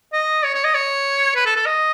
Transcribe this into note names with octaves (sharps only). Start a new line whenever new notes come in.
D#5
C#5
C#5
D#5
C#5
B4
A4
A4
D#5